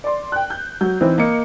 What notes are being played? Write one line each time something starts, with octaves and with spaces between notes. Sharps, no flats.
D5 C6
G5 F#6
G6
F#3 G6
E3 C4 D#4
A#3 D#5 C#7